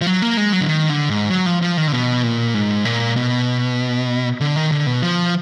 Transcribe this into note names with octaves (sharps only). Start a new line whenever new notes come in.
F3
F#3
A#3
G#3
F#3
D3
D#3
D3
G#2
F#3
F3
F3
D#3
D3
B2
A#2
G#2
A#2
B2
D3
D#3
D3
B2
F3